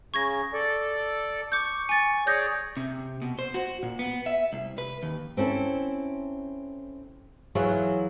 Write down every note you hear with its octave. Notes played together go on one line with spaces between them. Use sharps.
C#3 C#6 G#6 A#6
A4 D5
C#6 D6 G6
G#5 A6
G#4 C#5 D5 G6 A#6
C3
B2
C5
F#4
A#2
B3
E5
C2
B4
D#2
C4 C#4 E4 A4
E3 F#3 E4 F4 G#4 C#5